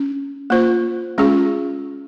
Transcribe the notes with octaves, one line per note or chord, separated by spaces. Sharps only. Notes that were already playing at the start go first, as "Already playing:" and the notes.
Already playing: C#4
A#3 F4 C5
G#3 C#4 F4 G#4